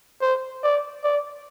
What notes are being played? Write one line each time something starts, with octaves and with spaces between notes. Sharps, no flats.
C5
D5
D5